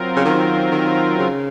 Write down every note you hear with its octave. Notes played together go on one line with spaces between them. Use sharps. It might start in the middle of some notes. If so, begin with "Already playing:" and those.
Already playing: F#3 C4 F4 A#4
C#3
D#3
D#3
C#3